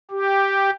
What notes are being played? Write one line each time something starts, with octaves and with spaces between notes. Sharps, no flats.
G4